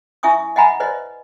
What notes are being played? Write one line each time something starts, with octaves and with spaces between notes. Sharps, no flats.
E4 E5 G#5 C#6 D#6
D#5 E5 F#5 G#5 A#5 B5
B4 C5 D5 D#5